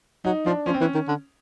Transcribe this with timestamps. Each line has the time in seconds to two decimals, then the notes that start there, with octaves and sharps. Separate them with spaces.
0.25 F#3 D#4
0.46 F3 D4
0.66 F3 C#4
0.74 C4
0.81 E3 C#4
0.95 D#3
1.08 D3